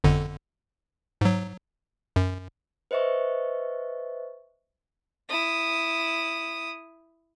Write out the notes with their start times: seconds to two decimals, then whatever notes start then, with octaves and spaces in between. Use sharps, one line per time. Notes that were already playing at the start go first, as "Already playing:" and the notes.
0.04 G1 F2 D3
1.21 G#2 F#3
2.16 F#2
2.91 B4 C5 D#5 E5 C#6
5.30 E4 D#6